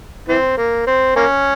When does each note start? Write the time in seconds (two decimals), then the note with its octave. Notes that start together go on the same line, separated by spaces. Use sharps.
0.28 E3 C4
0.57 A#3
0.87 C4
1.16 A#3 C#4